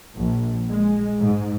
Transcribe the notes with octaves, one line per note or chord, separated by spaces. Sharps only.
A#1
G#3
G#2